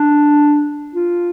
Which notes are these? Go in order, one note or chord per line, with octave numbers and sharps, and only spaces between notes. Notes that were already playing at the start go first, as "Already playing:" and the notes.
Already playing: D4
F4